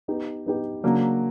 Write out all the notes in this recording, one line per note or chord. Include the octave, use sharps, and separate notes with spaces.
B3 D#4 G4
B3 D#4 G4
C#3 F#3 A#3 D4